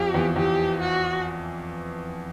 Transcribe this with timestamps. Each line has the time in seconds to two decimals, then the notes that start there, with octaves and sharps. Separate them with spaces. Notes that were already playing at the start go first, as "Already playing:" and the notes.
Already playing: F2 F3 G4
0.14 E2 E3
0.36 E2 E3 G4
0.81 F#4